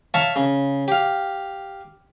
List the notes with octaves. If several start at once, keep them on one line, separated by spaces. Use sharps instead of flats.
C#5 E5 F5 A5 A#5 C#6
C#3
G4 F5